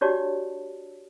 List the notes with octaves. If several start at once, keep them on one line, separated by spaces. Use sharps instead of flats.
D4 F#4 G4 C#5 D5 A5